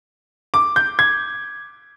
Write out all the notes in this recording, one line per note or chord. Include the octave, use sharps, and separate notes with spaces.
D6
G6
G#6